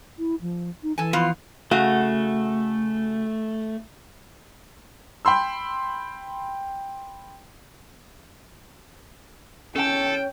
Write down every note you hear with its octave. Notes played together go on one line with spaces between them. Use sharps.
E4
F3
D#4
E3 A4 G#5
F3 B3 F4
C#3 A3 F#4 F5
G5 B5 C6 E6
C#4 A4 G5 A5